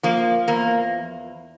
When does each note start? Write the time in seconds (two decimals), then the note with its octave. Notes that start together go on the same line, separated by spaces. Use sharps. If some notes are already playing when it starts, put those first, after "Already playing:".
0.03 F3 A#3
0.48 E2 A#3